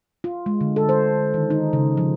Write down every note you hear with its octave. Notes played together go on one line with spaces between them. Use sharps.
F4
G#3
D3
A4
C5
D#3
D#4
C#3
F3